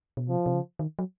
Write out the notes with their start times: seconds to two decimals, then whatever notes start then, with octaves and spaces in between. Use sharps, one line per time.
0.17 B2
0.29 C3 F3
0.46 C3
0.54 C#3
0.79 D#3
0.99 F#3